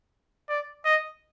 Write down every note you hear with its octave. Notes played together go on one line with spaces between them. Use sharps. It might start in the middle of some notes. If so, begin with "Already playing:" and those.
D5
D#5